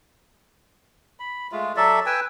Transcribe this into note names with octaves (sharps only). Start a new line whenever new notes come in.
B5
G#3 A3 F4
F#3 A4 D5 E5
B4 G5 G#5 E6